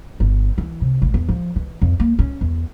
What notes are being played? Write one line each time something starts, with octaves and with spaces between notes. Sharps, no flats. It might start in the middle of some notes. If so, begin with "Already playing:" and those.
G1
E3
C3
A1
E2
F3
E3
F2
A#3
C#4
E2